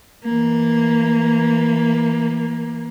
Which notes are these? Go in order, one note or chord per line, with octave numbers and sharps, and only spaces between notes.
E3 A#3